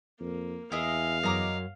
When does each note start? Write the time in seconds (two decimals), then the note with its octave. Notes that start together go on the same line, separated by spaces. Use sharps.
0.20 F2 A#3
0.72 E2 E4 G#4 D#5 F5
1.23 F#2 D#5 A#5 D6